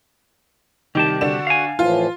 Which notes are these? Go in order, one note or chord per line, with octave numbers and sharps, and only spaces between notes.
C2 D#3 G4 A5
D3 D4 F#4 F#5 E7
F5 G#5
A2 E3 F3 F4